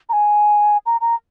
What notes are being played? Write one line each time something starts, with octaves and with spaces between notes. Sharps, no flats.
A#5
G#5
A#5
A#5